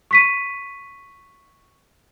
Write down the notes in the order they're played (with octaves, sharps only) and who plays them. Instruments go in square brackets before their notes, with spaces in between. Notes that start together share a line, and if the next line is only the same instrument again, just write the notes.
[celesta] C#6 B6 D#7